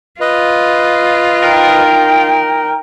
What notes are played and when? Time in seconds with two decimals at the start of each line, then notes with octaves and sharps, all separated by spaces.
0.20 F4 B4 D#5
1.44 D#4 A#4 G5